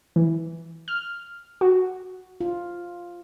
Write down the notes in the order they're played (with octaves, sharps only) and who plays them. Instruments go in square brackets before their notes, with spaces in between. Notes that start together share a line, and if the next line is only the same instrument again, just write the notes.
[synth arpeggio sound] E3
F6
F#4
[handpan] F4